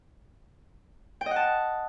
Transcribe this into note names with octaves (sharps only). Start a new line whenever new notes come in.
G5
D#5
F#5
A5